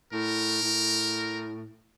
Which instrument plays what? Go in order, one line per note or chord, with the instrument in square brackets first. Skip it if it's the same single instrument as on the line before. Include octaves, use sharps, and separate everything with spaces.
[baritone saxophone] A2 [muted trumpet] A#4
[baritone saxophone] A2